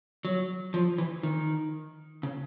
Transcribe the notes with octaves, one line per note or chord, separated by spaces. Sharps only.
F#3
F3
E3
D#3
C#3